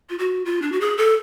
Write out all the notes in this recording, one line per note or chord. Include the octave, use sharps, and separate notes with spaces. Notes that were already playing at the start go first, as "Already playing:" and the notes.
F4
F#4
F4
D4
F#4
G#4
A4